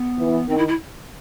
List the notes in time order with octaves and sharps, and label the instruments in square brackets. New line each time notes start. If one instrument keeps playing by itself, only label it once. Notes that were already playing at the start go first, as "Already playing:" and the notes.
Already playing: [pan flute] B3
[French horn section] E3
[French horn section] D#3 [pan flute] C4
[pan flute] E4
E4